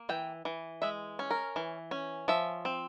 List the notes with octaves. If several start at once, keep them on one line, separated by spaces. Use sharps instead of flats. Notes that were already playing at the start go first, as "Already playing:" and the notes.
Already playing: A#3
E3 G5
E3
G#3 E5
C#4
A#4
E3
C#4
F3 E5
C4